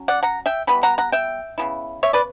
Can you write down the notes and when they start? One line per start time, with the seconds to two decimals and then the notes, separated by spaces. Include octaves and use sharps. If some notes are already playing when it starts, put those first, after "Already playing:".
Already playing: F#3 C#4
0.08 D5 F#5
0.23 F#5 A#5
0.46 E5 G5
0.67 E3 G3 B3 B5
0.83 F#5 A#5
0.98 F#5 A#5
1.12 E5 G5
1.58 C#3 G3 B3 E4
2.03 C#5 E5
2.13 B4 D5